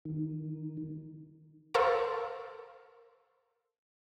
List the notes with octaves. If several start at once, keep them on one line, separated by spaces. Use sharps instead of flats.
D#3
A4 A#4 C5 F5 A5 C#6